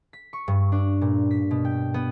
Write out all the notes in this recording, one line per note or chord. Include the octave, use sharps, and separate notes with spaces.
B6
C#6
G2
D4
A#2
B6
B2
G5
B3